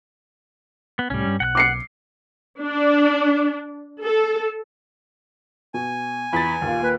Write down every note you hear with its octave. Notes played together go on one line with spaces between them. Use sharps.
B3
C2 A2 G3 C#4
G2
B1 F#5 G5 F#6
D6 C7 C#7
D4
A4
B2 G#5
E2 B5 A6
D#2 A#2 A#3
B4